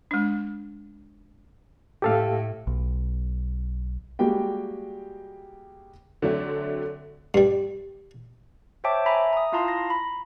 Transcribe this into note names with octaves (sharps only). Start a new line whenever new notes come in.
G#3 D4
A2 G4 A4 F5
B1
G3 G#3 A#3 F#4 G4 G5
D3 F#3 A3 C4
G2 G3
C5 C#5 E5 G5 A5 D6
E5 G#5 A#5 B5
A#5 D#6
E4 F4 F5 A5 A#5 C6
A#6
A#5 B5